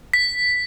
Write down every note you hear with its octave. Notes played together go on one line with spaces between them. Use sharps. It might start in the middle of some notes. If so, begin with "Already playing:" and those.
B6